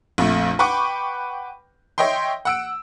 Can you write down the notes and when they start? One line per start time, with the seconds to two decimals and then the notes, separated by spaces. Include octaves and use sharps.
0.18 A#1 F2 A3
0.59 B4 F#5 G5 B5 C#6 D6
1.98 C#5 D#5 E5 G5 C6
2.45 F#5 E6 D7